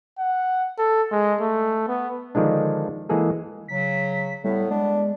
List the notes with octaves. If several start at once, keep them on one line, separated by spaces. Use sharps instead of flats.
F#5
A4
G#3
A3
B3
D3 D#3 F3 G#3 D4
E3 G#3 A#3 G#4 A4
C#3 F#3 B6
A2 G3 B3
G#3 D4